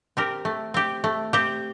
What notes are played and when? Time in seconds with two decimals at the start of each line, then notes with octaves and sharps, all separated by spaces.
0.17 C4 G4 A#4
0.45 A3
0.74 C4 G4
1.04 A3
1.33 C4 G4